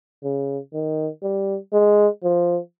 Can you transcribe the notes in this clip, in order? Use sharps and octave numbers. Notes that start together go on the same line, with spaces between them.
C#3
D#3
G3
G#3
F3